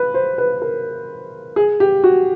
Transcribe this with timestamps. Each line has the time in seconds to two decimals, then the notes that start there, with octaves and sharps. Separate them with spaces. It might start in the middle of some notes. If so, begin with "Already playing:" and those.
Already playing: B4
0.14 C5
0.38 B4
0.62 A#4
1.56 G#4
1.80 G4
2.04 F#4